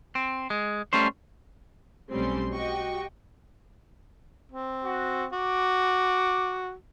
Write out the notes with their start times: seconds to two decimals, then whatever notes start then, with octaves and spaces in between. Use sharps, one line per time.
0.15 C4
0.50 G#3
0.93 G3 A3 C#4 C5
2.12 B1 G3 A3 C4 C#4 C6
2.52 F#4 G4 D#5 G5 C#6
4.52 C4
4.84 F#4
5.32 F#4 D6